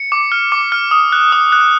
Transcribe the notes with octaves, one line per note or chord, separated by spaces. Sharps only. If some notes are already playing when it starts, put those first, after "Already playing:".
Already playing: C#7
D6
F6
D6
F6
D#6
F#6
D#6
F#6